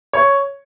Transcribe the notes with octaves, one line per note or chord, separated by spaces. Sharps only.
C#5